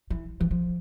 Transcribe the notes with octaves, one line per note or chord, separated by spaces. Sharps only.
E3
E3
F3